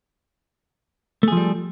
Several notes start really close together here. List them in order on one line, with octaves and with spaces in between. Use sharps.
A3 G#4 F3 G3